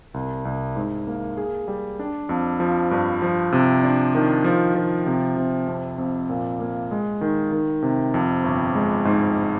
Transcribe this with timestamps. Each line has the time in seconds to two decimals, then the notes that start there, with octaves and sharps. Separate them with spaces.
0.14 C2
0.45 C2
0.76 G#2
1.07 A#3
1.37 G#4
1.68 G3
1.99 D4
2.29 F2
2.60 F3
2.91 G2
3.22 F3
3.52 C3
3.83 D4
4.15 D#3
4.44 F3
4.75 F3
5.07 C3
5.37 C3
5.67 F2
5.98 F2
6.30 A#2
6.60 A#3
6.91 G#3
7.21 D#3
7.52 D#3
7.82 C3
8.14 F2
8.44 G1
8.75 G#3
9.05 G#2